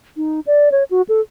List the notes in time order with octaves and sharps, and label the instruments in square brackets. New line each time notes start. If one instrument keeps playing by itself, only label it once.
[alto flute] D#4
D5
C#5
F#4
A4